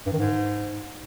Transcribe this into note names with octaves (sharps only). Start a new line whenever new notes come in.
G2
D#3
G#2